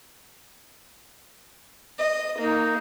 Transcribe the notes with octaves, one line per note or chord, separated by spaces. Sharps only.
D#5
A#3 D#4